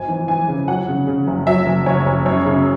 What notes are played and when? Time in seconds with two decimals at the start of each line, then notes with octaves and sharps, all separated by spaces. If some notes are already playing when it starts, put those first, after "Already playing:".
Already playing: G#1 G#5
0.08 E3
0.28 E3 G#5
0.48 C#3
0.68 F#3 F#5
0.88 C#3
1.07 C#3
1.27 F#1
1.47 F#3 E5
1.66 F#1
1.86 F#1 C#5
2.06 F#1
2.26 F#2 C#5
2.46 C#3